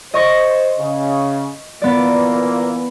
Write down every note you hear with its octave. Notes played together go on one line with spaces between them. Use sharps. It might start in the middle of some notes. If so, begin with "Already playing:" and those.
C5 D#5 C#6 A#6
C#3
A#2 E3 A#3 B3 D5